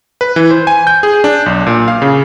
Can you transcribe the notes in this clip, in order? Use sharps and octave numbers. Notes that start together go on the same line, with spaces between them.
B4
E3
C5
G#5
G6
G#4
D4
B1
A#2
F5
C#3